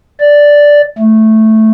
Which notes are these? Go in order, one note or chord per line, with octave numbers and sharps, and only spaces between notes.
D5
A3